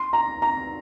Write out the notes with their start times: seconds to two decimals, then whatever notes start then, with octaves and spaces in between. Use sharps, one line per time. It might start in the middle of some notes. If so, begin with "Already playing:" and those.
Already playing: C6
0.13 A#5
0.42 A#5